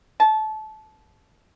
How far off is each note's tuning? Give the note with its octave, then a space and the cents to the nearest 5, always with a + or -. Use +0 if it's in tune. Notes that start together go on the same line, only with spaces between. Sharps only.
A5 -25